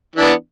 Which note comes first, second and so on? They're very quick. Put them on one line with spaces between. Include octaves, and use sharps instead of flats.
E3 D4 B3